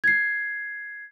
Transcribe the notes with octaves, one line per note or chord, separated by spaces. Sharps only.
G#6 C7